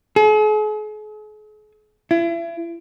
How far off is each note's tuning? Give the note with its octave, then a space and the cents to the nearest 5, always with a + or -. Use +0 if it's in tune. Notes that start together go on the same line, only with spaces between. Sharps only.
G#4 +45
E4 +35